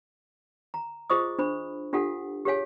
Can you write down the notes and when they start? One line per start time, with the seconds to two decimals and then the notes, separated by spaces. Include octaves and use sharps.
0.74 A#5
1.10 F4 G#4 C5 D#5 C#6 D#6
1.39 D4 C5 B5
1.93 D4 F4 G4 A4 F5 F#5
2.45 G4 G#4 C#5 F5 G#5